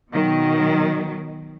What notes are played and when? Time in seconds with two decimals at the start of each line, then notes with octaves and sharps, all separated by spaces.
0.11 B2 D#3 F#3